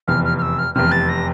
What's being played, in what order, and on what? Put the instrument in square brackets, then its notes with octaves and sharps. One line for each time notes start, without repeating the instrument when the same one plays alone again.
[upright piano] F1 E2 C3 [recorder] F6
[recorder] F6
F6
E6
F6
[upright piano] F1 E2 C3 [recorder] F6
[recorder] A6
A#6